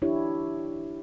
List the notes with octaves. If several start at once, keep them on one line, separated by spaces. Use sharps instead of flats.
D4 E4 G4 C#5